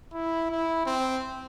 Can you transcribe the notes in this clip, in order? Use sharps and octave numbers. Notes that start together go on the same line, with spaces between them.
E4
E4
C4